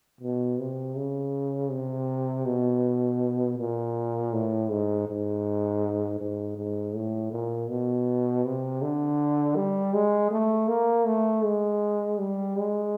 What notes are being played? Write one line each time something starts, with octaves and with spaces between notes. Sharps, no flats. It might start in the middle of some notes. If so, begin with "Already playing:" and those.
B2
C3
C#3
C3
B2
A#2
A2
G#2
G#2
G#2
G#2
A2
A#2
B2
C3
D3
G3
G#3
A3
A#3
A3
G#3
G3
G#3